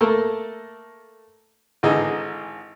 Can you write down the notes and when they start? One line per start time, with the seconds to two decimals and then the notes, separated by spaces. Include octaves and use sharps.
0.01 A3 A#3 A4 A#4
1.83 G#1 D3 E3 D#4 G#4